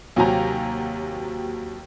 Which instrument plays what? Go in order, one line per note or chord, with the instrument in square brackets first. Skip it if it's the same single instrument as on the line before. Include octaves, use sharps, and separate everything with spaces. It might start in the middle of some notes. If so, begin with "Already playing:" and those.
[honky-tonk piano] D#2 C3 F#3 G4 G#5 A#5